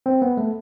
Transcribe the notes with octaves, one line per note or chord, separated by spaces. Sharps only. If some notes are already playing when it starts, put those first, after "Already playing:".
C4
B3
A3